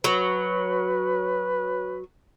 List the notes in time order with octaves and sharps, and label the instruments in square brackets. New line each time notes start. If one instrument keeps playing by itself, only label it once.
[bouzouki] F#3 [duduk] B4